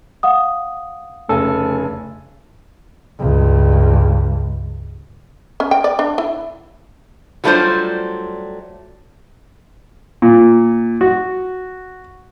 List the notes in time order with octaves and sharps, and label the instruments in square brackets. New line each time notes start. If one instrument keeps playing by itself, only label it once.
[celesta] F5 F#5 D#6
[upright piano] F1 C#3 G#5 [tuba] A3 [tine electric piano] A4
[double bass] C#2 G2
[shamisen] C#4
G5
D5
D4
E4
[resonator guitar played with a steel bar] F#3 G3 A3 D4 F4 C5
[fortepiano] A#2
F#4